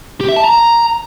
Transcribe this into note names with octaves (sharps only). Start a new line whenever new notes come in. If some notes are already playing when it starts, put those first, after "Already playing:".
G4
E5
A5
A#5